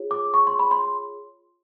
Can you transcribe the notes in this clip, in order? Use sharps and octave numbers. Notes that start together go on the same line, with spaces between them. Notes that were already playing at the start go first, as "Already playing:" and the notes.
Already playing: F4 G#4 C#5
D6
C#6
C6
B5
C6